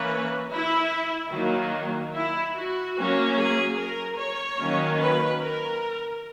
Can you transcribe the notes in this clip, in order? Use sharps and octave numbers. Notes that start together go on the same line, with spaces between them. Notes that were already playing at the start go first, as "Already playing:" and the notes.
Already playing: E3 A#3 C#4 B4
E4
D#3 F#3 A#3
E4
F#4
F#3 A#3 C#4
G#4
A#4
C#5
D#3 F#3 A#3 C#4
B4
A#4